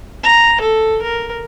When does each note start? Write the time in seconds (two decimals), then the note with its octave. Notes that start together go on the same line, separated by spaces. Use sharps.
0.24 A#5
0.61 A4
1.02 A#4